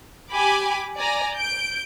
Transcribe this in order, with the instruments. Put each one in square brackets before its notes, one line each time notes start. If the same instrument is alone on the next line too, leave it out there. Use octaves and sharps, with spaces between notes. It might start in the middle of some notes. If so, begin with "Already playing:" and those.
[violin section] G4 G#5 B5 D6
D5 G#5 A#5 A#6
G6 D7